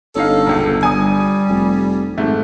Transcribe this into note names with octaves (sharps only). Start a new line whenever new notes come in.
G1 C#4 D#4 A4 F5
E1 C#2
G3 G#5 D#6
F1
G#1 G#2 A3